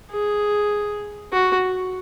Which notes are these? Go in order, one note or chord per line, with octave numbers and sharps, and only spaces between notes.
G#4
F#4